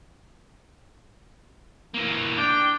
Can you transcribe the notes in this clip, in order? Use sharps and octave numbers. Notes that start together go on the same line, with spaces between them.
E3 A#3
D4 G5